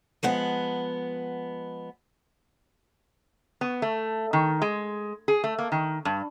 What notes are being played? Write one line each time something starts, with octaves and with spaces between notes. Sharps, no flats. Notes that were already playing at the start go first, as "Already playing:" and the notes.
F3 G#3 B3 F#5
B3
A3
D#3
G#3
G#4
A3
A#3
D#3
G2